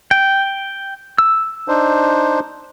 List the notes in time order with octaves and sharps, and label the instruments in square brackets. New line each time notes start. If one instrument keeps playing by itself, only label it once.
[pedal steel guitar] G5
E6
[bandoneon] D4 D#4 C5